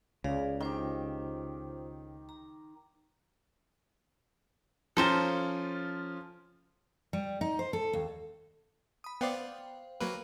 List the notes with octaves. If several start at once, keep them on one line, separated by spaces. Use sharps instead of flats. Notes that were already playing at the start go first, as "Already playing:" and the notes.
C#2 C#3 G#4 D5 F5
D#3 F4 G4 C5
A#5
F3 C#4 F4 A4 C5 A#5
G3
D#4
C5
A4
D#2
B5 D#6
B3 C5 D5 F5 G5
F#3 A#3 B4